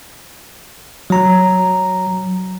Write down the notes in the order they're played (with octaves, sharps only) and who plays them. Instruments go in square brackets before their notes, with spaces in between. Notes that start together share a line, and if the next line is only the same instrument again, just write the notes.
[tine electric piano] F#3 A#5